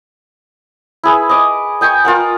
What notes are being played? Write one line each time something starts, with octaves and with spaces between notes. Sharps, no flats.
E4 G#4 B4
D#5 D6
D#5 G5 G#5 C#6
F4 A#4 F#5